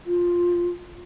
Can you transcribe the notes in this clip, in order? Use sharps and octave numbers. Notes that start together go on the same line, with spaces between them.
F4